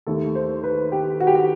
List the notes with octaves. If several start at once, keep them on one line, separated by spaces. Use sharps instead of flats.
D#2 D#3 A3 A4
C5
B4
G4
F#4
G4
F#4